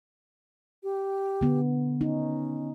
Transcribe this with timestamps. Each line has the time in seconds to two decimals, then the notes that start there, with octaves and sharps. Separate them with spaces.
0.83 G4
1.41 D3 B3
2.01 C#4 D#4